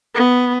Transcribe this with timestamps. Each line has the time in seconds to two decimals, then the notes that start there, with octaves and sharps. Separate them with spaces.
0.15 B3